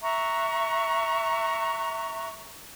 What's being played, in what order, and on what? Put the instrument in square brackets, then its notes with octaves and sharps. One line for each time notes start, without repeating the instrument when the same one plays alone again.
[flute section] E5 A#5 C#6 F#6